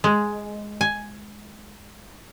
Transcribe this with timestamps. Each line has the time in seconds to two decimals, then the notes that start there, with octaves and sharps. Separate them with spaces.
0.04 G#3
0.81 G#5